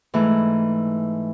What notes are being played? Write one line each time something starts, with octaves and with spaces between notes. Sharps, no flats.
G#2 E3 A3